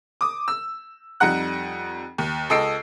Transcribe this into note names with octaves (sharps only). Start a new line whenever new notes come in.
D6 D#6
E6
F2 G3 D#4 F#5 F#6
D#2
C#2 A4 D#5 E6 C7 D7